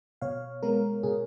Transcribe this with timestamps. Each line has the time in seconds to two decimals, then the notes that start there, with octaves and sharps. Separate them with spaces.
0.22 B2 C#5 F5
0.63 G#3 B3 A#4
1.03 B2 G#4